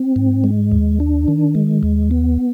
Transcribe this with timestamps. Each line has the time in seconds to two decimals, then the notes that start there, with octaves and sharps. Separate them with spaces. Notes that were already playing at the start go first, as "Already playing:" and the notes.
Already playing: C4
0.16 G#2
0.44 G#3
0.72 D#2
1.00 D4
1.28 D#3
1.55 G#3
1.83 D#2
2.11 B3